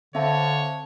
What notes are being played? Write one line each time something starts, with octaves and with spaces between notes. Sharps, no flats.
D3 C4 C#5 E5 F5 A5